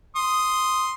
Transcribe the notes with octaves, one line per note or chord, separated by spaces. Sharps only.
C6 D#6